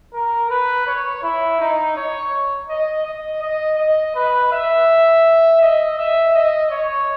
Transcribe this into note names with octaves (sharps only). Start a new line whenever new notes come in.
A#4
B4
C#5
E4
D#4
C#5
D#5
D#5
D#5
D#5
B4
E5
D#5
E5
D#5
C#5